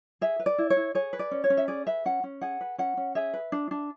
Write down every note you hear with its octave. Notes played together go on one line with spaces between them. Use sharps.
G#4 E5
B4
D5
E4
C#5
E4
G#4 C#5
B4
D5
C#4
C#5
C#4
E5
G#4 D5
B4 E5
C#4 F#5
C#4
G#4 F#5
B4
C#4 F#5
C#4
G#4 E5
B4
D4
D4